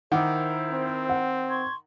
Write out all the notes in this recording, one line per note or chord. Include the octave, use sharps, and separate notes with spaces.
D#3 E4 A#4 C5 F#5 D6
C4
F#5
C6 C#6 G#6